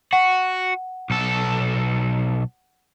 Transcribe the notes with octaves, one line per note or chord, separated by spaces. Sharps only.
F#4 F#5
B1 A4